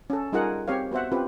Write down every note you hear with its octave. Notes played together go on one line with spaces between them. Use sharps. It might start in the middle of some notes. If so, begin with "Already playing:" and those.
C#4 A4
G3 D#4 F4 G#4 A#4 F#5
C4 G4 C#5 F5
B3 F#4 C5 E5 F#5
C4 C#4 F4 G4 B4